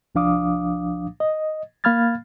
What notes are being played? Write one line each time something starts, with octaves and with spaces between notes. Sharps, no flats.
C2 F3 D4 F5 D6 D#6
D#5
A#3 F5 B5 F6 G#6 A6